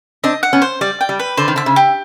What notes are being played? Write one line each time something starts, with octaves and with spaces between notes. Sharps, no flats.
C4 D4 D#5
F#5
B3 C#4
C5
G3 D5
G5
G3
B4
D3 C5
D#3
D3 E5
C#3
G4